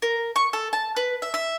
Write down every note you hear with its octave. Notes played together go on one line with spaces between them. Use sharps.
A#4
C#6
A4
A5
B4
E5
E5